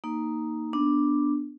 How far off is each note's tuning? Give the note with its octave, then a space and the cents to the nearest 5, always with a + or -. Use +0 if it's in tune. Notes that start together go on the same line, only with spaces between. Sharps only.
A#3 +0 D#4 +0
B3 +0 D4 +0